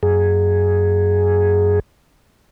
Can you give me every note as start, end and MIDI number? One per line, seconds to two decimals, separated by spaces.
0.03 1.80 42
0.03 1.80 68